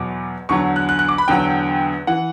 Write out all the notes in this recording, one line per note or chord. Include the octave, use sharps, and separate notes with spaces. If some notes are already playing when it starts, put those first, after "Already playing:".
Already playing: E2 B2 F#3 D6
E2 D3 F#3 C#6
F#6
F#6
F#6
D6
B5
E2 D3 F#3 G5
E3 F#5